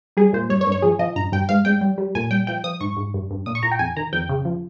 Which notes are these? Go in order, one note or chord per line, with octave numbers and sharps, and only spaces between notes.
G3 G#4
A#2 C5
G2 C#5
C#5
G2
C#5
F3 G#4
F3 D#5
G2 A#5
G2 G5
G#2 F5
G#2 G5
G3
G3
A#2 G#5
G3 G5
F3 G5
F3 D#6
G#2 C#6
G#2
G2
G2
A#2 D#6
C#6
A#2 A#5
G5
F2 G#5
D#3 A#5
F2 G5
C#3
F3